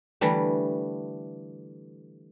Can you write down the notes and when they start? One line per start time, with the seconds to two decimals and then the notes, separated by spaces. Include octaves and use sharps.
0.21 D3 E3 G3 A3